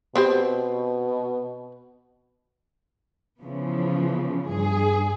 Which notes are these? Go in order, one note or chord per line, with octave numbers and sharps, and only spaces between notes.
B2 B3 C4 G4
C#3 E3 F3 B3
G2 G#4